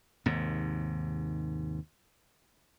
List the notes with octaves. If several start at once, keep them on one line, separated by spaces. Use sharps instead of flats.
D#2 G#2 C3